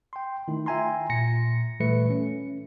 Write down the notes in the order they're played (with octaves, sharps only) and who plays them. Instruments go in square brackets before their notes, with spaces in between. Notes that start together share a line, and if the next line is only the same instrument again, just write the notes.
[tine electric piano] G5 C6
D#3 A3 D#4 E4
F4 E5 G5 G#5 A#5 C6
A#2 A#6 C#7
A#2 E3 G3 A3 B4 C#7
C#4